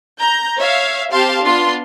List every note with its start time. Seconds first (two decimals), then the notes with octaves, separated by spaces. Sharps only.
0.21 A#5 G6
0.59 C#5 E5 F5
1.12 C4 G4 F5 A5 C6
1.45 B3 D4 F4 C6